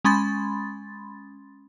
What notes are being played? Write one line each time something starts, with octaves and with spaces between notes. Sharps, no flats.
G#3 C#4 B5 C6 A6